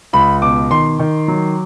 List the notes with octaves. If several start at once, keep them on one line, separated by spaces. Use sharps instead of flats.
C#2 B5
B2 D6
D#3 C6
D#3
F#3